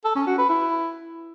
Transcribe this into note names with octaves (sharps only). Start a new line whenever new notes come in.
A4
C#4
F#4
B4
E4